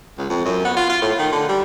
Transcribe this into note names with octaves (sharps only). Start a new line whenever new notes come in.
C#2
F2
F#2
B3
F4
F4
A2
D#3
D3
G3